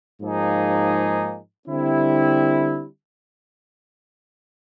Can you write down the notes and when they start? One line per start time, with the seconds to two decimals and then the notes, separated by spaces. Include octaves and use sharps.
0.20 G#2 F3 A#3 D#4 G#4
1.68 D3 G3 C4 E4